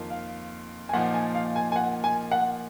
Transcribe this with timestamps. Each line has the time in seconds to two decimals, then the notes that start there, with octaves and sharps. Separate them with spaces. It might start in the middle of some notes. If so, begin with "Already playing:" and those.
Already playing: F2 D#3 A#3 F4
0.10 F5
0.89 G#5
0.93 A#2 F3 A#3 D#4 F#5
1.14 G#5
1.35 F5
1.56 G#5
1.72 G#5
1.76 F#5
2.04 G#5
2.32 F#5